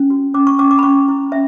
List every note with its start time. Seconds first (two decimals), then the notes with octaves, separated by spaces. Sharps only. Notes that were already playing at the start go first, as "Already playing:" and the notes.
Already playing: C#4
0.10 F#4
0.34 C#4 D6
0.47 C#6
0.59 C#4 D6
0.71 D6
0.79 B5
0.83 C#4 C#6
1.08 E4
1.32 C#4 E5